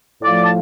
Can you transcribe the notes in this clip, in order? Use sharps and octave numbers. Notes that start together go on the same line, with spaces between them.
A2 F3 A3 F4 D5
A5